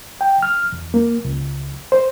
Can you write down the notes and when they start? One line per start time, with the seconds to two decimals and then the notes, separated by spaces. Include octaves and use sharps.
0.21 G5
0.43 F6
0.72 E2
0.94 A#3
1.25 C#2
1.92 C5